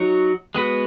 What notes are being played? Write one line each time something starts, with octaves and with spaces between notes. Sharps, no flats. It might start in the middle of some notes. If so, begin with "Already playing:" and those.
Already playing: F#3 D#4 F#4 C#5
G#3 B3 F#4 B4